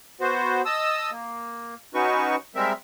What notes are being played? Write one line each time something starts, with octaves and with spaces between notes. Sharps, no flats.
B3 F#4 C5
D#5 A5 D#6 E6
A#3
C#4 D#4 F#4 B4 C#6
G3 G#3 C4 A#4 E5